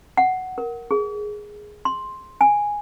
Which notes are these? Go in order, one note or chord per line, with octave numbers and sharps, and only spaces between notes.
F#5
A#4
G#4
C6
G#5